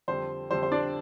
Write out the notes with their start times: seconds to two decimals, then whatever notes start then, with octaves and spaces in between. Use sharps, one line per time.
0.08 F2 D3 G3 C5
0.51 F2 D3 G3 C5
0.63 C5
0.72 D4 D5